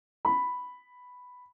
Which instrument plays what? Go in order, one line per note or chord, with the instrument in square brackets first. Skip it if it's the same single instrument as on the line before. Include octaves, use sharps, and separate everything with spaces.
[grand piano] B5